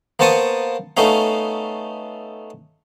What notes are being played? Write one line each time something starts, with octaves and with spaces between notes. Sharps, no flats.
A#3 B3 C5 A5 C#6 D#6
A3 B3 C#4 D#4 F5